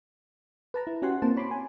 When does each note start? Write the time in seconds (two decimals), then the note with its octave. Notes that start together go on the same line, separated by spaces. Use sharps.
0.74 B4 A5 A#5
0.87 E4
1.02 C#4 F#4 G4 F#5 G#5 C6
1.22 A#3 C4 C5 A5
1.37 C#5 B5 C6 D6
1.51 G#5